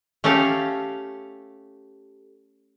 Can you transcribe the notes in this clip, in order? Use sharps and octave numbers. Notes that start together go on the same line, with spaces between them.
A3 C#4 G4 A4 F5